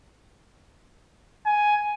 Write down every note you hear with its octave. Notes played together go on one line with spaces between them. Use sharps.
G#5